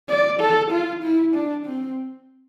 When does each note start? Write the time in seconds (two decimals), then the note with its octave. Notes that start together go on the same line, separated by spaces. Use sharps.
0.08 D5
0.40 A4
0.71 F4
1.03 E4
1.34 D4
1.66 C4